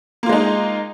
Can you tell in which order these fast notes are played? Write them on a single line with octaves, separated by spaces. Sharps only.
A#3 F4 G#3 D#4